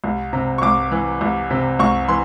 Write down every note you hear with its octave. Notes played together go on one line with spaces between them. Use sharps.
C2
C3 A#5
C#6
C2 D6
E3
C2
C3
C2 C#6
E3 C6